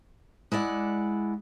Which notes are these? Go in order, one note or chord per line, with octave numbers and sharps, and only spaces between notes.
G#3 E4 D5 F#5